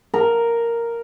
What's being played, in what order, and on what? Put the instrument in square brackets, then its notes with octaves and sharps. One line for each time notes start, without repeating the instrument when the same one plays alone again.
[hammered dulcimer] A#4